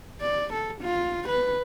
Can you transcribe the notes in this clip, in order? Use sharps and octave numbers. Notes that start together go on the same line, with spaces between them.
D5
A4
F4
B4